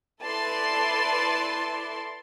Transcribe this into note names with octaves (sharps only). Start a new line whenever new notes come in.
E4 A4 B4 D5 A5 C6